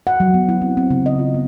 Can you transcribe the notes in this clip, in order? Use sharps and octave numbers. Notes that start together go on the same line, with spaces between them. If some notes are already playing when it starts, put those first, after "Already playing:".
F#5
F#3
B3
E4
C4
C4
C#3
D#5
F4
B3